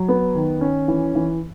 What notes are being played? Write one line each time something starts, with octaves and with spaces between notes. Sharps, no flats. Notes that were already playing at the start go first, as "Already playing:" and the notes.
Already playing: F#3
B3
D#3
C#4
E3
E3